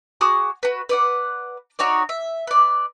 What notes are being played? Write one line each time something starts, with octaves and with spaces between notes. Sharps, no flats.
F#4 G#4 D6 D#6
F#4 B4
B4 D5 F#5
D#4 F#4 C#5 D5
E5
B4 D5